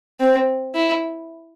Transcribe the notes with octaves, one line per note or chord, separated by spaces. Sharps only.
C4
E4